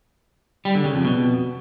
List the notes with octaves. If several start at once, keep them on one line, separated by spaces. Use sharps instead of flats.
G3
D3
C#3
F2
B2